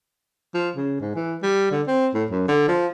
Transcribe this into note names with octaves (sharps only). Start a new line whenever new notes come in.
F3
C#3
G#2
E3
G3
D3
C4
A2
F#2
D3
F3